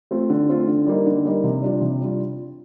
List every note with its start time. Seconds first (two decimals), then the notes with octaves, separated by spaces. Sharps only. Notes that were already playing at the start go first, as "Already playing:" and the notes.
0.11 A3 C4 F4
0.30 D3
0.49 A3 C4 F4
0.68 D3
0.86 G3 A#3 D#4
1.06 D3
1.25 G3 A#3 D#4
1.44 C3
1.62 G3 D4 F4
1.81 C3
2.01 G3 D4 F4